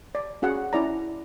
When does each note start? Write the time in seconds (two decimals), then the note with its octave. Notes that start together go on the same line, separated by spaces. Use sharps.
0.15 D5
0.42 C#4 F#4 G#4 F#5
0.73 C#4 E4 D5 A#5